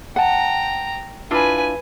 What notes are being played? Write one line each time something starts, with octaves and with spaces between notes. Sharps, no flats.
F#5 G5 A5 A#5
D4 E4 F4 B4 G#5